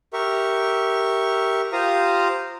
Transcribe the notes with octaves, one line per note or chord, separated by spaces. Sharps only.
G4 A#4 E5 C#6
F4 G4 C5 F5 A#5 D#6